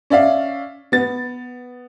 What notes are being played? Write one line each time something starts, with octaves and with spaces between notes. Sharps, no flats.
C#4 D5 E5 F5
B3 A6